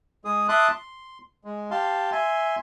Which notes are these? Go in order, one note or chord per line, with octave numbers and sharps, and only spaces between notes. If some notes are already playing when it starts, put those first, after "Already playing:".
G#3 G#4 D#6
E5 A5 C6 D6 D#6 F#6
C6
G#3
G4 F5 A5 C6
E5 G#5 C6